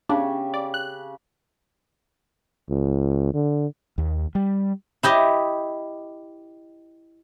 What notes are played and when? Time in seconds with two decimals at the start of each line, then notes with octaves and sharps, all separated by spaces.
0.09 C#3 D4 G4
0.54 D5
0.74 F#6
2.70 C#2
3.34 D3
3.98 D#2
4.35 G3
5.03 E4 G4 D#5